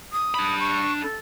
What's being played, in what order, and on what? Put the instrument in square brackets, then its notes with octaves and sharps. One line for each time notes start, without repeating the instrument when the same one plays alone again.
[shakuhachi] D#6
[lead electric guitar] D4 B5
[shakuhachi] C#6
A4